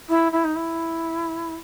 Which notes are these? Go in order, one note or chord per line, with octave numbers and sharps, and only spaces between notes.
E4
E4
D#4
E4